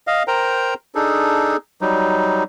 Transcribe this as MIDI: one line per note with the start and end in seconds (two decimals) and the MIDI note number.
0.07 0.23 75
0.07 0.23 77
0.28 0.74 70
0.28 0.74 72
0.28 0.74 79
0.28 0.74 82
0.95 1.57 62
0.95 1.57 63
0.95 1.57 68
0.95 1.57 69
1.81 2.43 54
1.81 2.43 55
1.81 2.43 63